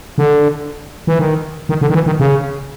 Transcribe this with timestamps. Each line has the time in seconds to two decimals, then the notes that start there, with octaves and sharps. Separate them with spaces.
0.18 D3
1.07 E3
1.19 D#3
1.69 D#3
1.81 D3
1.90 D#3
1.94 E3
2.06 D#3
2.20 C#3